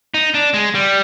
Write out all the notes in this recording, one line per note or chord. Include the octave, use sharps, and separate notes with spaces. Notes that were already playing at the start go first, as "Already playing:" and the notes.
D#4
D4
G#3
G3